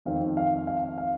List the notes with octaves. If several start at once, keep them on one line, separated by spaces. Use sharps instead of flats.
F2 D#3 C4 F5
F5
F5
F5